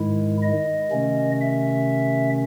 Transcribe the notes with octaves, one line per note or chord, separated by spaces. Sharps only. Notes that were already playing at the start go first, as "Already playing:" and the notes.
Already playing: G#2 D#3 G#3 E4
D#5
C3 D#3 A3 C#4
E5